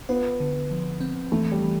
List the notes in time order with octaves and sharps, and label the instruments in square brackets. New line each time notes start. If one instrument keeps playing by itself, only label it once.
[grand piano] B3 [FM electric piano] F4
[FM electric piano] D3
F3
C4
[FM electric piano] E3 [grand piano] A3
[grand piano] G3
[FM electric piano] E3